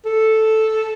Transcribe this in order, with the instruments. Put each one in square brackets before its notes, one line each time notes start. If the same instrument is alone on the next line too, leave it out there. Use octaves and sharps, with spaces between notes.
[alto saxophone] A4